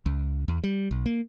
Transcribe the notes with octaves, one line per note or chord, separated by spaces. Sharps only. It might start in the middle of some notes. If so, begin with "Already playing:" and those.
C#2
E2
G3
B1
A#3